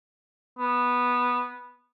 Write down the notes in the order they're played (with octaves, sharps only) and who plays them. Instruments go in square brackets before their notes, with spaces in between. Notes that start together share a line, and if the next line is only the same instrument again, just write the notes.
[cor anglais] B3